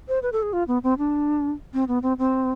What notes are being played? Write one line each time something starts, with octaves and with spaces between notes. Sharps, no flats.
C5
B4
A4
G#4
F4
B3
C4
D4
C4
B3
C4
C4